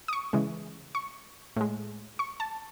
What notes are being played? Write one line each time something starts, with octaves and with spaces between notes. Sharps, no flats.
D#6
C#6
C#3 E3 G#3
C#6
A2 G#3
C#6
A5